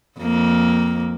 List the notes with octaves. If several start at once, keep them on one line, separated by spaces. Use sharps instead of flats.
F2 A#3